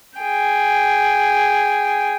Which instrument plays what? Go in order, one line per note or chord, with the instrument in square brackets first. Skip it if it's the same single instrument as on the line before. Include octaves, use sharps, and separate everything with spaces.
[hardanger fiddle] G#4 G5